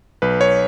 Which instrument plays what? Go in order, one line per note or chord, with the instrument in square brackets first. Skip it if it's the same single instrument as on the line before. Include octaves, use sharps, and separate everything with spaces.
[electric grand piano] B1 B4
C#5